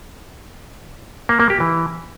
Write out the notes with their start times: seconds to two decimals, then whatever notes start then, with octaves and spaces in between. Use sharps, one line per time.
1.29 A#3
1.40 A#3
1.50 G4
1.60 E3